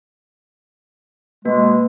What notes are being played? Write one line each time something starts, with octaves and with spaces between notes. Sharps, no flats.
B2 G#3 A#3